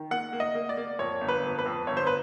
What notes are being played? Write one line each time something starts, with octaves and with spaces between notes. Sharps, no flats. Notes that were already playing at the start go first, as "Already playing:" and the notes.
Already playing: D#3
A#3 F#5
A#3
D#5
A#3
D5
A#3
F2 C#5
G1
B4
F2
B4
F2
G1 C#5
C5
B4